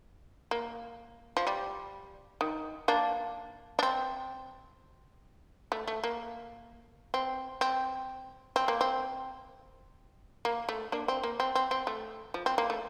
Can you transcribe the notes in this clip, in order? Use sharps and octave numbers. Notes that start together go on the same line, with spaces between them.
A#3
F3
G3
D#3
A#3 D4
D4
C4
A3
A3
A#3
C4
C4
C4
A#3
C4
A#3
A3
A#3 D4
C4
A#3
C4
C4
C4
A3
F3
C4
A#3
A3